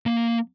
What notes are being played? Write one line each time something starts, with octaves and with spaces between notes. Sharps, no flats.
A#3